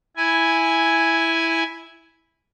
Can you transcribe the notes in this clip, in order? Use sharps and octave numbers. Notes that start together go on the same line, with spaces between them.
E4 G#5